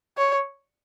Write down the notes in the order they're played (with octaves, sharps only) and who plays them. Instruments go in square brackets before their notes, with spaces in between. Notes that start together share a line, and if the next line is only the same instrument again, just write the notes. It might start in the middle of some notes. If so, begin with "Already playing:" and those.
[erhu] C#5